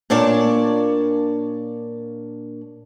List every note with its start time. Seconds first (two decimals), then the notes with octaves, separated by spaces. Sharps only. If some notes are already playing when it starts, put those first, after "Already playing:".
0.10 A#2 A#3 D4 C#5 D5 A5